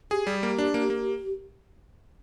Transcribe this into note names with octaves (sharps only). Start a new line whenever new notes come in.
G4 G#4
G3
A#3
D4
A#3
A#3